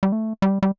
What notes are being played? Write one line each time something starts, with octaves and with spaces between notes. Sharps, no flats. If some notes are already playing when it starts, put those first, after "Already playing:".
G3
A3
G3
G3